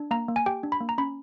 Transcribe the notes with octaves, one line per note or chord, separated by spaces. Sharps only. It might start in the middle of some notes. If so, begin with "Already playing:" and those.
Already playing: D4
A#3 A#5
A#3
G#5
G4 G5
D4
B5
A#3
A#5
C#4 B5